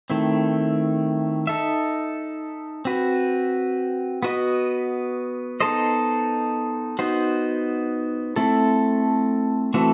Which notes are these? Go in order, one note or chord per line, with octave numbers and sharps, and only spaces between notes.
D#3 A3 C4 E4
D#4 A4 E5
C4 F#4 B4
B3 F#4 B4 D#5
B3 D#4 A4 C5 D#5
B3 D#4 F#4 C5
A3 C4 E4 A4
E3 A3 C4 F#4 A4